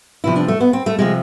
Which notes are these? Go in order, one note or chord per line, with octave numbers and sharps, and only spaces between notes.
E2 C3 F3 E4
D4
A3
B3
C4
A3
C3 F3 G#3